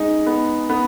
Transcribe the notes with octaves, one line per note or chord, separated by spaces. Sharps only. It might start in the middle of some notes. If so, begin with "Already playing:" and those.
Already playing: G#3 D#4
B3
B3